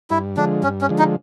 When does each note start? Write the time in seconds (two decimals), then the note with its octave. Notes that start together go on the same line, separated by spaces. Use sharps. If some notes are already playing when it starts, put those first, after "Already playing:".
0.10 G2 E4
0.37 D3 F3 G#3 D4
0.63 G2 C#4
0.81 C#4
0.89 D3 F3 G#3
0.99 D#4